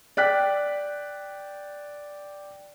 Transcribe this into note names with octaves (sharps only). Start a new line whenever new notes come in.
D5 G5 F#6 B6